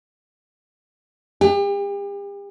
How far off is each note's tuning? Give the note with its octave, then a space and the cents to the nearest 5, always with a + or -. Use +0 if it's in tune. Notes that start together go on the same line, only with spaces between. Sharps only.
G4 +40